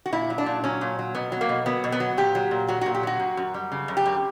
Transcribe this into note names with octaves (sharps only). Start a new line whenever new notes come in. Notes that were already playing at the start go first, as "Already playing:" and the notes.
F#4
A#2 E4
F#3
D4
A#2
F#3 C#4
A#2
F#3
B2 B3
F#3
A#3
B2
F#3 B3
B2
B3
F#3
A#2 G4
F#3
A#2
F#3 F#4
F#4
A#2
G4
F#3 F#4
F#2
F#2
G3
C#3
F#2
G4
F#2